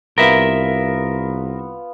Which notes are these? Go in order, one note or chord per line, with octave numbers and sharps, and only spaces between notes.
C2 B3 F4 A#4 E5 F5